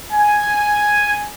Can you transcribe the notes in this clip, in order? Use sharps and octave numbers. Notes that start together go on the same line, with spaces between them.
G#5